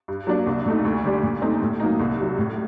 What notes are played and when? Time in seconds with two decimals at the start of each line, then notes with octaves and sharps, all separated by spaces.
0.08 G2
0.27 F#3 A#3 D4
0.47 C2
0.66 A#2 A3 D#4
0.85 D2
1.04 D3 G3 D4
1.23 A#2
1.42 A3 C4 D#4
1.62 A2
1.80 F#3 A#3 D#4
2.00 C2
2.19 C3 F#3
2.38 A2